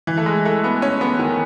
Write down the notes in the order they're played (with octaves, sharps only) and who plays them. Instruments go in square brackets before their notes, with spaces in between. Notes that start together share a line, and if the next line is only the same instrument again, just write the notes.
[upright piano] E3
A3
G#3
A3
B3
C#4
B3
D#3